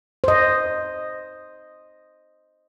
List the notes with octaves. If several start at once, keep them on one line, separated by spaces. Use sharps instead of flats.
C5 D#5